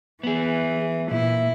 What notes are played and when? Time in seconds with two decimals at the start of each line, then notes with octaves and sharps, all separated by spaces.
0.23 E3 B3 G#4
1.11 A#2 E4